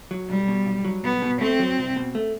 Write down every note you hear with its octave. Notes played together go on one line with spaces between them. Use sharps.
F#3
B1 G3
B2
B1
F#3
B1 B3
B2
A3 C4
F#3
C2
B2
A3